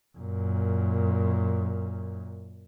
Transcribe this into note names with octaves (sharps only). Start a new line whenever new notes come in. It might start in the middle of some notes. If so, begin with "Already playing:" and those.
F#2 A#2